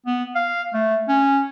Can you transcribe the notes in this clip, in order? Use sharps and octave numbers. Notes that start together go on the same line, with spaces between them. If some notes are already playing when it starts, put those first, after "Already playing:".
B3
F5
A3
C#4